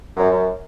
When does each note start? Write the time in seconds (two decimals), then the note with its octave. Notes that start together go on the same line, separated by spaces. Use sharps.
0.17 F#2
0.31 F#2